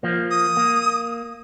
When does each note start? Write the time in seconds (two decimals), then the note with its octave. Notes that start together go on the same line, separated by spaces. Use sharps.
0.03 F3 A#3
0.30 D#6
0.57 A#3